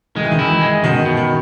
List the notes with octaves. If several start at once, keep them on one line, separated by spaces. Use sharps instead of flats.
D#3 G#3
E3
D#3
E4
E3
G#3
B2 D#3
B2
D#3